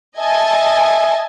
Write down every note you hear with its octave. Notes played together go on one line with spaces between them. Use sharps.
D#5 E5 G#5 A5